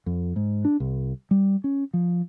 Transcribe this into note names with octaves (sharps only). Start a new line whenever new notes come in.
F2
G#2
D4
C2
G3
C#4
F3